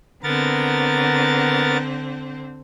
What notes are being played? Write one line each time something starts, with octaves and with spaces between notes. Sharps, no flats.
D3 B3 C4 A#4 A6